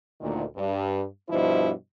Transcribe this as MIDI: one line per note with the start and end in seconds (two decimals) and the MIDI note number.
0.20 0.43 38
0.20 0.43 46
0.20 0.43 51
0.56 1.03 43
1.29 1.70 43
1.29 1.70 47
1.29 1.70 53
1.29 1.70 64
1.29 1.70 72
1.29 1.70 75